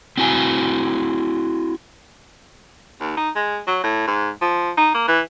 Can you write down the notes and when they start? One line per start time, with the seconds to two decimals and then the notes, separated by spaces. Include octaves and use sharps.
0.18 C4 E4 F#4 G#5
3.00 D#2
3.17 D#4
3.36 G#3
3.67 F#3
3.84 A2
4.07 G#2
4.42 F3
4.77 D#4
4.94 A#3
5.08 E3